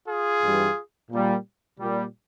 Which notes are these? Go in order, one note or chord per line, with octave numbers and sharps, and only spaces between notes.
F4 G#4
G2 E3 G3
A#2 G3
A#2 G3